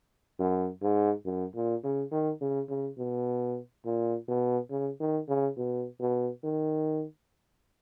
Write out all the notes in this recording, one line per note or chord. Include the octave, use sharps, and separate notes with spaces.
F#2
G#2
F#2
A#2
C#3
D#3
C#3
C#3
B2
A#2
B2
C#3
D#3
C#3
B2
B2
D#3